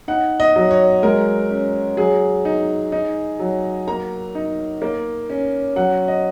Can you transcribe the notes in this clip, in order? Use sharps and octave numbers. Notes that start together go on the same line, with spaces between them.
D#4 F#5
D#5
F#3
C#5
G#3 A#4
C#4
F#3 G#4
D#4
D#4
F#3
A#3 A#5
D#4
A#3
C#4
F#3 F#5
D#5